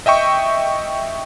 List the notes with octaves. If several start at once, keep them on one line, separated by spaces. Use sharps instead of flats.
D#5 E5 G5 C#6